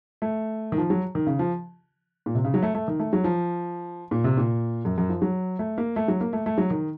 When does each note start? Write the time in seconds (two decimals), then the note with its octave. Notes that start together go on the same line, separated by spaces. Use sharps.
0.22 A3
0.72 D#3
0.78 F3
0.90 F#3
1.15 D#3
1.27 C#3
1.39 F3
2.26 A#2
2.35 C3
2.44 C#3
2.54 F#3
2.63 A3
2.75 A3
2.88 D#3
2.99 A3
3.13 F#3
3.24 F3
4.11 A#2
4.24 C3
4.37 A#2
4.85 F#2
4.98 F#2
5.09 F3
5.22 F#3
5.59 A3
5.78 A#3
5.96 A3
6.08 F#3
6.21 A#3
6.33 A3
6.46 A3
6.58 F#3
6.70 D#3